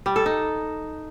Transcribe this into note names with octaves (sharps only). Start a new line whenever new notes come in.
G3
A4
D#4